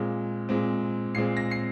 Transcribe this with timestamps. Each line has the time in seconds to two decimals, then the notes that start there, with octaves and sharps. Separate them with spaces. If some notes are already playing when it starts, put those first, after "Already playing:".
Already playing: A#2 G#3 C4
0.49 A#2 G#3 C4
1.15 A#2 G#3 C4 C7
1.37 A#6
1.51 C7